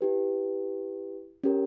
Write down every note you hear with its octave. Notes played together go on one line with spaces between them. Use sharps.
E4 G4 B4
C#4 G4 A#4